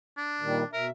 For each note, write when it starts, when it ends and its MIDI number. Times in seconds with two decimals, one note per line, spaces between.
0.17 0.68 62
0.41 0.64 46
0.41 0.64 51
0.41 0.64 55
0.73 0.90 47
0.73 0.86 70
0.73 0.90 76